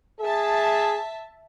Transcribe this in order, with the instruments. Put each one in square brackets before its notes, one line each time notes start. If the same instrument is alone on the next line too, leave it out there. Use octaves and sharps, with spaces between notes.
[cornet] G#4 [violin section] E5 A5